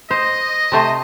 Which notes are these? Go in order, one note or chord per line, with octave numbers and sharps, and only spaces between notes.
C5 D#5
C3 A3 C5